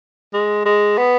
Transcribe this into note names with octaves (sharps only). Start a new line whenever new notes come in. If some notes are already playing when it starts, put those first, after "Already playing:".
G#3
G#3
B3